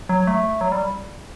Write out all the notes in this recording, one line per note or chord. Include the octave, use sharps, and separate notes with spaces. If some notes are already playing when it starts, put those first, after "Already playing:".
F#3
A3
F#3
G3